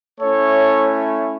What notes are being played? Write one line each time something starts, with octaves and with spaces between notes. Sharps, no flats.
A3 C#4 E4 A4 C#5